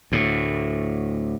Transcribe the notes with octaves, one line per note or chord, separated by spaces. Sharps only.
D2 A2